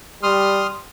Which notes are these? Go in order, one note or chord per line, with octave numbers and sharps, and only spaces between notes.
G3 C6 D#6 F6